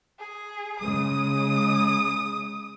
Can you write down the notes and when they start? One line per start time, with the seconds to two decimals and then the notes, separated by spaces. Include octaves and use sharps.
0.19 G#4
0.80 C#3 G#3 D#6